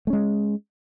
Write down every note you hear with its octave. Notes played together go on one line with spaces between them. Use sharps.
G#3 A3 C#4